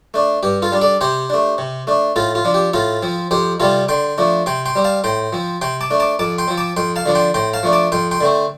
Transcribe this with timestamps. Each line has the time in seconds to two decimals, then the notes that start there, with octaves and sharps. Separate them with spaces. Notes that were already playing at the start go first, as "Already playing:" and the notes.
0.14 A3 D4
0.43 G2 G4
0.62 F4 A4
0.72 G3 D4
0.82 A4 D5
1.01 C3 G4 C5
1.30 A3 D4
1.58 C3
1.87 A3 D4
2.16 A2 F4 A4
2.35 F4
2.45 F3 D4
2.54 G4
2.73 A2 F4 A4
3.02 F3 C4
3.31 F2 G4 C5
3.60 C3 G3 C4 F4 A4
3.89 D3 G5 C6
4.18 F3 A3 D4
4.46 C3 G5 C6
4.66 G5 C6
4.75 G3 C4
4.84 F5 A5
5.04 A2 G5 C6
5.33 F3 C4
5.61 C3 G5 C6
5.81 A5 D6
5.90 A3 D4
6.00 A5 D6
6.19 F2 A5 D6
6.38 G5 C6
6.48 F3 C4
6.58 A5 D6
6.76 F2 G5 C6
6.96 F5 A5
7.06 D3 F3 D4
7.15 G5 C6
7.34 A2 G5 C6
7.53 F5 A5
7.63 F3 A3 D4
7.73 A5 D6
7.92 F2 G5 C6
8.11 G5 C6
8.21 D3 A3 C4